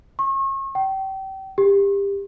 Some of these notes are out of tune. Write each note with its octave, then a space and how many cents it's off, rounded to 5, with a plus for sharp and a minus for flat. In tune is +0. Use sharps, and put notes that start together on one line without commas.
C#6 -35
G5 -30
G4 +25